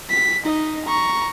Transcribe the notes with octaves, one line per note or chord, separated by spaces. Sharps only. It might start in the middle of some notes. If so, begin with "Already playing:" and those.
B6
D#4 D#5
A#5 C#6